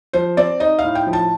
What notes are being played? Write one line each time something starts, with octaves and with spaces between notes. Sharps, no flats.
F3 C5
C4 D5
D#4 D#5
F5
A2
G5
F3
A5